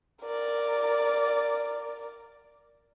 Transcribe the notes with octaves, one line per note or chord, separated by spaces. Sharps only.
A#4 D5